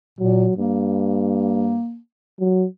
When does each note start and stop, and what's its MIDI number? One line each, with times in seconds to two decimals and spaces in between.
0.19 0.47 46
0.19 0.54 54
0.57 1.79 43
0.57 1.98 58
2.40 2.66 54